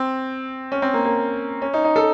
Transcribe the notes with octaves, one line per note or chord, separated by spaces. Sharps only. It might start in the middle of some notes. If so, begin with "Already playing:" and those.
Already playing: C4
C#4
C4
A#3
A#3
C#4
D#4
D#4
A4